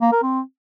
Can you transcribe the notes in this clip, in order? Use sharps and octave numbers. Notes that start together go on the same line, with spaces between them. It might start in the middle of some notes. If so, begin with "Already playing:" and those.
A#3
A#4
C4